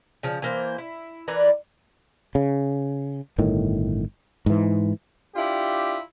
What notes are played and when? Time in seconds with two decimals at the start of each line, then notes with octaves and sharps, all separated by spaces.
0.23 C#3 F3
0.42 E3 A#3 C5
0.78 E4
1.28 E3 A#4 B4 D5
2.35 C#3
3.38 G1 A2 D#3
4.46 G#2 E3
5.36 D4 E4 F4 G4